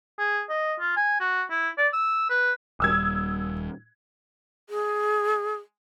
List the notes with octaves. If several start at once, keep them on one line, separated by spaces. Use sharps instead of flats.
G#4
D#5
F4
G#5
F#4
E4
D5
E6
B4
D#1 G3 D#6 E6 G#6
G#4